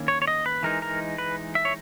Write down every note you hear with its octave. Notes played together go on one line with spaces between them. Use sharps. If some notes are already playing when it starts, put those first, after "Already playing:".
Already playing: D#3 A#3 C#4 E4
C#5
C#5
D#5
B4
E3 G#3 D#4 A#4
A#4
B4
E5
C#5